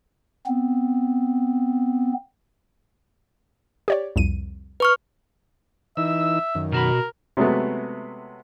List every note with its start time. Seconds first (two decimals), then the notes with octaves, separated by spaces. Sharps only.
0.46 B3 C4
3.88 G4 C#5 D5
4.16 C2 F2 D#7
4.80 B4 C#6 F6
5.97 E3 D#4 E5 E6
6.55 F#2 D#3
6.72 B2 F#4 A#4 B5
7.37 C3 F#3 G#3 A3 B3